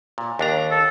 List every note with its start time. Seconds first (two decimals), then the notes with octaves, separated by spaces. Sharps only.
0.18 A#2
0.39 D#2 D4 A#5
0.71 A4